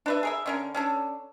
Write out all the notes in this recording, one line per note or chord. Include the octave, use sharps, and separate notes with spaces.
D4 B4 E5
G#4 A#4 E5
D3 C#4 A#4
C#4 D4 A4